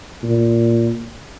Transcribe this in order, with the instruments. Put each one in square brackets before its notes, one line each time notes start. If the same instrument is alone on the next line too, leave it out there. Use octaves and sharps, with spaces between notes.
[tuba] A#2